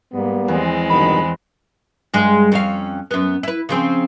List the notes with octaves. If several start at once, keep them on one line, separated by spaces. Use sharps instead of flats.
G#2 G3 A#3 B3
E2 F3 G#3 C4
G2 B2 D#3 B5
G2 G#3
F2 C#4 F5
F#2 B3
E4 B4
C#3 F3 C4